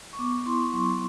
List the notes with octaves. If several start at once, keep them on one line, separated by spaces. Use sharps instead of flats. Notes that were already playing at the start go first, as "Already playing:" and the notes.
C#6
B3 D6
E4 C6
C#6
F#3 C6